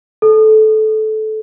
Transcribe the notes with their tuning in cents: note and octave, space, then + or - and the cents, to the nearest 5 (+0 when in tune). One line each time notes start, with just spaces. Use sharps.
A4 -20